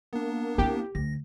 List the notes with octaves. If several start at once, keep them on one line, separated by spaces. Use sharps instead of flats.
A#3 B3 D4
C4 E4 G4
D2 A#6